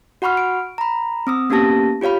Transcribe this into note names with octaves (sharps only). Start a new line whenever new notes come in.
F#4 F#5 B5 C#6 F6
D7
A#5 B5
C4 D#6 E6
A#3 B3 C#4 G4 A5 A#6
F4 G4 C#5 F5 B5